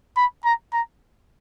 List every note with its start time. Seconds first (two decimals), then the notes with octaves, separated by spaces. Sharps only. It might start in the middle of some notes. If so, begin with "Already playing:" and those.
0.17 B5
0.45 A#5
0.73 A#5